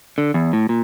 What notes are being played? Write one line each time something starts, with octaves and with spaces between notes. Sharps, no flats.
D3
E2
A2
A#2